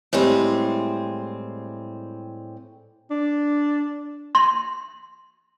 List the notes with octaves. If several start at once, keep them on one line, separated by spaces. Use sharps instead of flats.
A2 G3 G#3 C4
D4
C6